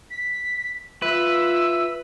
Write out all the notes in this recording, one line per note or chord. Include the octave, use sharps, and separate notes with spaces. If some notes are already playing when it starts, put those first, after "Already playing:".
B6
F4 B4 E5 E6